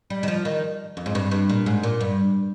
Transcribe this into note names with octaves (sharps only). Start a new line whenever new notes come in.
G3
D#3
F3
D#3
F2
G#2
G2
G2
A#2
G#2
A#2
G2